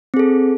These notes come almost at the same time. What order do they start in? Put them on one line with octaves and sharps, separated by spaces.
C4 G#4 A4